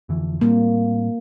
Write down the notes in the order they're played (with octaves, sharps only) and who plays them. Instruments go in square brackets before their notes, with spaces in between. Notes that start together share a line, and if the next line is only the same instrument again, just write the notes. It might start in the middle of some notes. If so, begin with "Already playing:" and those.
[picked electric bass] F2 D3 E3
[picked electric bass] A2 G3 C4 [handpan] A#3